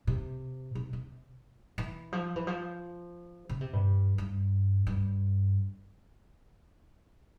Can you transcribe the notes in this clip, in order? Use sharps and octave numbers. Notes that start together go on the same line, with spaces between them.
C3
C3
C3
E3
F3
E3
F3
C#3
C3
G2
G2
G2